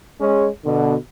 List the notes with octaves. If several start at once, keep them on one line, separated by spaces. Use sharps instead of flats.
G#3 C#4
B2 D3